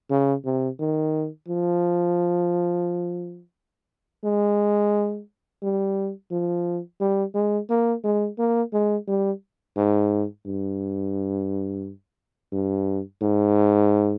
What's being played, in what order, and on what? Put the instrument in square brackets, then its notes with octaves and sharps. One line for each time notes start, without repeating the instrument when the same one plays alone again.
[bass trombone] C#3
C3
D#3
F3
G#3
G3
F3
G3
G#3
A#3
G#3
A#3
G#3
G3
G#2
G2
G2
G#2